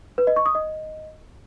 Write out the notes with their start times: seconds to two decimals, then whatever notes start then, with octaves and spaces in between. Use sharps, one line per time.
0.18 B4
0.27 D#5
0.36 C#6
0.46 D#6
0.55 D#5